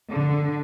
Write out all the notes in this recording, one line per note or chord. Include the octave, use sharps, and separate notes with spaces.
D3